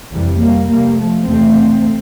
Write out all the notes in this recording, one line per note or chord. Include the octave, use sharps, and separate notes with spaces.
F2 C3 E3 G3
G3 A#3
F2 C3 G3 A#3
F3 A3
E2 C3 A3 C4